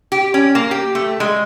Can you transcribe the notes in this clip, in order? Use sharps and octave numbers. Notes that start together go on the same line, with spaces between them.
G4
C#4
A#3
G4
A3
G#3